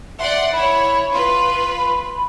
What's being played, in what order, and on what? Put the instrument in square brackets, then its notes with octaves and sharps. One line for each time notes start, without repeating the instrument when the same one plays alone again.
[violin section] D5 F#5 C6 [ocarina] E5
[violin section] E4 C#5 [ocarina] B5
[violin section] F4 B4 [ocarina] C6
[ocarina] B5